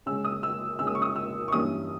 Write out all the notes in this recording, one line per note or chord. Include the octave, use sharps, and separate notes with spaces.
C#3 G#3 C#4 E6
D#6
E6
C#3 G#3 C#4 E6
D#6
C#6
D#6
E6
C#6
G2 E3 G3 A#3 C#4 D#6